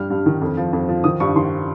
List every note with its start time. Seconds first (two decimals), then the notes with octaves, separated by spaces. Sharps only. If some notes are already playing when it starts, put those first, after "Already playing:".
Already playing: G2 G3 F6
0.10 G2
0.26 D#3
0.42 F2
0.57 F3
0.73 F2
0.89 F3
1.04 D#3 D#6
1.20 G2 C#6
1.36 D#3 C6